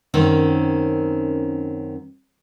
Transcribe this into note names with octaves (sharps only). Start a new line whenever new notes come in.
F#2 D#3 C4 C#4